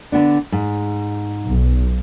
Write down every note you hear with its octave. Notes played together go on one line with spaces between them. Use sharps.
D3 B3 D4
G#2
B1